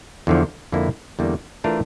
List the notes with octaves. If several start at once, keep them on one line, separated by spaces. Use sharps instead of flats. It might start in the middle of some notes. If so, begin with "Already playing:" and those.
E2 D3 F3
F2 D3 F3 A#3 E4
E2 D3 G3 A#3
E3 A3 D4 F4 A#4